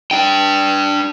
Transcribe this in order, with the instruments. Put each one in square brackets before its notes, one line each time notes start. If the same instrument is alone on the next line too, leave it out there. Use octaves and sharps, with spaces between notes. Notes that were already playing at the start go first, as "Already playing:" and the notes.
[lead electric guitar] D4 G5